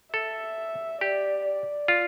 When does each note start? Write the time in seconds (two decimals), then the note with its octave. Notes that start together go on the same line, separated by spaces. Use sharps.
0.14 A4 E5
1.01 G4 D5
1.45 D5
1.88 F4